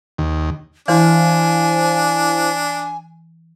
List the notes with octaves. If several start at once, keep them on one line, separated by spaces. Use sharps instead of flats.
D#2
E3 D4 E4 C5 F5 G#5